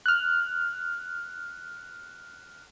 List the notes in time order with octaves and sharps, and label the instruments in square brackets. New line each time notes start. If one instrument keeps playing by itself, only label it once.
[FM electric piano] F6 F#6